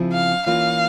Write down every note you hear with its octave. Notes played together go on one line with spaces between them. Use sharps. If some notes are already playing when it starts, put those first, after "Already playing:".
Already playing: C#3 F3 C4 E4
F5
E3 A#3 C#4 F4 F5